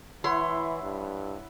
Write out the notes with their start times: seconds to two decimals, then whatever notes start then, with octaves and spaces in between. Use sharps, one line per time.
0.24 E3 E4 C#5 F#5 C6
0.83 G2